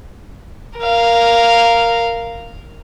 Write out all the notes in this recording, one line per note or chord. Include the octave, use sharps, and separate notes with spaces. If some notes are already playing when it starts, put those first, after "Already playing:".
A#4 F5